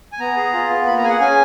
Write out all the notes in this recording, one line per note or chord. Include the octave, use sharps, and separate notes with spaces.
G#5
B3 A#5
G#4
F4
B3
A#3 B5
A#5
G#4 G#5
F#5
C#4 G#5